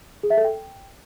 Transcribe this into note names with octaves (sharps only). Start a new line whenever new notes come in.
G#4
E5
A4
G5